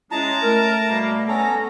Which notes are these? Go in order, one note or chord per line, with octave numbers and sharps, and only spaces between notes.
G#3 C#4 E4 A5 A#5
A3 A#4
B2 G3 A#3
B3 C#4 A4 A#5